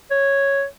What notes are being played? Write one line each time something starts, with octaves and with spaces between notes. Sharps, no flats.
C#5